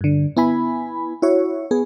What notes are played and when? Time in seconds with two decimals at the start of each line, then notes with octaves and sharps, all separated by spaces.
0.01 G2 D3
0.37 B3 E4 G#5 B5
1.22 E4 F#4 C#5
1.71 B3 G#4